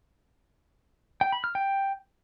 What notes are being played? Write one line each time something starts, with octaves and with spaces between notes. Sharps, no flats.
G5
B5
F6
G5